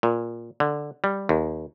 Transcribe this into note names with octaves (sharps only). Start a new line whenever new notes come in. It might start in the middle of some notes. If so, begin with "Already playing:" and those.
A#2
D3
G3
D#2